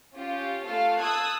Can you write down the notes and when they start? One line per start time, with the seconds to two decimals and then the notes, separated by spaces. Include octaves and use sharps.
0.15 C#4 F4 G4
0.64 A3 F4 A4 F5
0.99 A5 D#6 E6 F#6 G#6